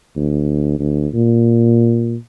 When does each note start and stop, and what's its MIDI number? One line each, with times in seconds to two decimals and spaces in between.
0.16 0.77 38
0.79 1.08 38
1.14 2.16 46